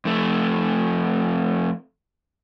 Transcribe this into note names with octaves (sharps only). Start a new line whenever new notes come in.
F2 A3